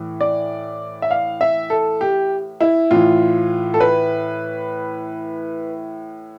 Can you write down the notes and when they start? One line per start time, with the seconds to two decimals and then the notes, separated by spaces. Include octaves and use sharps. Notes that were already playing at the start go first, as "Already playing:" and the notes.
Already playing: A2 E3
0.21 D5
1.02 E5
1.11 F5
1.41 E5
1.70 A4
2.01 G4
2.61 E4
2.91 A2 E3 F4
3.74 A4
3.80 B4